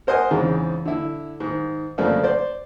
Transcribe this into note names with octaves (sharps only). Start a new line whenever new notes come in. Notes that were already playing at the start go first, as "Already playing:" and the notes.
A#4 C5 D#5 F#5 G#5
E2 G#2 C#3 G#3 C4
D3 E4
G#2 D#3
F2 C#3 F3 A3 A#3 D4
C5 D5